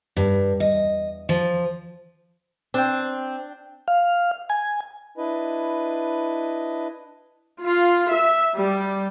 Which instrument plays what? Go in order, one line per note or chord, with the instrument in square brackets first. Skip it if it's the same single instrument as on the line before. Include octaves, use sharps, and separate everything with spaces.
[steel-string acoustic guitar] G2
D#5
F3
[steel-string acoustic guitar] C4 [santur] D4 G5
[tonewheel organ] F5
G#5
[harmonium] D4 E4 B4 D#5
[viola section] F4
E5
G3